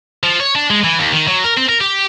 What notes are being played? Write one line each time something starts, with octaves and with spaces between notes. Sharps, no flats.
F3
C#5
D4
G#3
E3
D#2
D#3
F#3
A#4
C4
A#4
G4